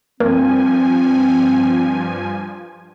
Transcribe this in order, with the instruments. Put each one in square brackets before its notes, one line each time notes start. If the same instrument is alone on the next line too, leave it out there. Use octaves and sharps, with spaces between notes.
[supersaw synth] G2 F3 G#5 [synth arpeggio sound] A#3 [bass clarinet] C4